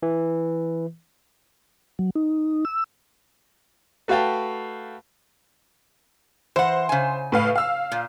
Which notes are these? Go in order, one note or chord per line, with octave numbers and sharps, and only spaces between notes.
E3
F#3
D#4
E6
A3 F#4 B4 F5 G5 A5
E3 C5 F#5
C#3 G#5
A2 B4 F5
F5 E6
A#2